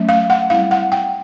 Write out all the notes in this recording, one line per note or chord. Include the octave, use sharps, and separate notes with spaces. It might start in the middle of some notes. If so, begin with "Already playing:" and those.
Already playing: F#3 A3 C#4
F5
F#5
G3 C4 E4 F5
F#5
G5